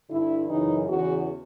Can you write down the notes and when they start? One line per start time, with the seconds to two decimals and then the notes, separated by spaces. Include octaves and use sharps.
0.09 G2 D3 E4
0.48 F#2 C#3 E3 D#4
0.87 E2 C#3 E3 F#4